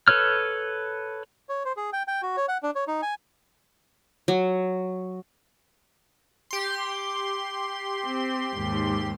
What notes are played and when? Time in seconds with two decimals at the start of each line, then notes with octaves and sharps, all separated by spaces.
0.08 A4 B4 C#5 F6
1.49 C#5
1.65 C5
1.77 G#4
1.93 G5
2.08 G5
2.22 F#4
2.37 C#5
2.48 F#5
2.63 D4
2.75 C#5
2.88 D#4
3.02 G#5
4.28 F#3
6.51 G4 C6
8.04 C4
8.56 D#2 G#2